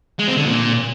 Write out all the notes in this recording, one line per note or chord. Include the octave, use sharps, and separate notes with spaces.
G#3
C4
D3
A#2